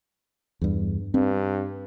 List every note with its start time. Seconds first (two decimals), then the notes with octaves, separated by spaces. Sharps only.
0.61 E2 G2
1.14 G2 C4